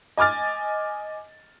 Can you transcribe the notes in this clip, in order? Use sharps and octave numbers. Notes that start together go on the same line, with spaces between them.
D#5 G#5 D6 F6 A6